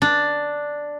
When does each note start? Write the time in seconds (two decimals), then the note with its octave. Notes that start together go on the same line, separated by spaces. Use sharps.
0.02 D4